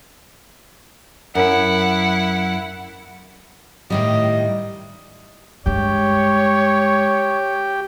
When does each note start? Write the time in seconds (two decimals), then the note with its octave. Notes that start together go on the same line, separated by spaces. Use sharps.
1.35 F#2 E4 F#5
3.90 A2 D#3 G3 D#5
5.66 G2 G#3 G4 C#5